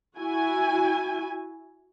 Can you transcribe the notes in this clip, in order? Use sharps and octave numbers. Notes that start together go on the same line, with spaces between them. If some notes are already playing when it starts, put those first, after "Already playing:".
E4 F#4 G#5